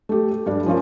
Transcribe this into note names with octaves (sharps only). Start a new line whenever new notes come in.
A3 G4
A4
G2 G3 D4
F3 C#4 F4 A#4